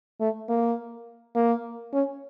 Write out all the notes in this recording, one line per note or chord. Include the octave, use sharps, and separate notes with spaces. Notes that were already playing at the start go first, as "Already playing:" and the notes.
A3
A#3
A#3
C#4